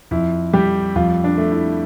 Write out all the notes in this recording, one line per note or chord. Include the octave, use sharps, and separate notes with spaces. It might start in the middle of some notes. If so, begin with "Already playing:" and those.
F2 E4
G3 G4
F2 F4
D4
A3
E4